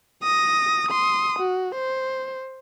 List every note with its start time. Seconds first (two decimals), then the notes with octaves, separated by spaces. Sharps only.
0.23 D#6 A#6
0.89 C6 D#6
1.39 F#4
1.75 C5